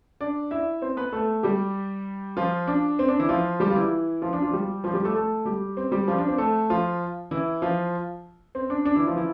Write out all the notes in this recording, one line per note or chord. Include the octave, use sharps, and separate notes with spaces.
D4 D5
E4 E5
C4 C5
B3 B4
A3 A4
G3 G4
F3 F4
D4
C4
D4
E3 E4
F3 F4
G3 G4
F4
E3 E4
F3 F4
D4
F3 F4
G3 G4
F3 F4
G3 G4
A3 A4
A3 A4
G3 G4
C4
G3 G4
F3 F4
D4
C4
A3 A4
F3 F4
E3 E4
F3 F4
C4
D4
D4
E3 E4
F3 F4
E3 E4